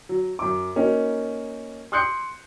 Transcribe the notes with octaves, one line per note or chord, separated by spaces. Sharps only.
F#3
F#2 D6
A#3 C#4 D#4 F#4
C6 D#6 F#6 G6 C7 C#7